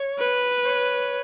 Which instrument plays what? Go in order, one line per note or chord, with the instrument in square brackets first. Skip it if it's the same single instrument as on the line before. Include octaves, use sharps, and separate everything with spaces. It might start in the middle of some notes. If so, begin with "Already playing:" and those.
Already playing: [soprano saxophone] C#5
[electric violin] B4
[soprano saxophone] C#5